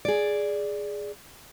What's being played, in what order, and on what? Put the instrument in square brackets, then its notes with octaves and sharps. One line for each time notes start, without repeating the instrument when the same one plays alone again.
[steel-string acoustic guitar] G#4 D5